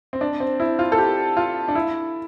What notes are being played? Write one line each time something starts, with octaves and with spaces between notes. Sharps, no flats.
C4
D4
C4
E4
F4
A4
G4
F4
D4
E4